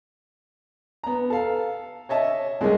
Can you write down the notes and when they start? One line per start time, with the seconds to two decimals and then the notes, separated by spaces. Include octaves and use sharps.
1.04 B3 A#5
1.30 A4 F5
2.09 C#5 D#5 E5 A5
2.61 C2 G#3 A#3 D#5